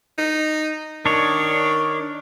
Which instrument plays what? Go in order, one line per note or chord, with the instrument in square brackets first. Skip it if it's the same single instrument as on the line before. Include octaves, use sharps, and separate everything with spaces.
[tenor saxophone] D#4
[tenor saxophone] D#3 [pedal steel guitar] D4 C#5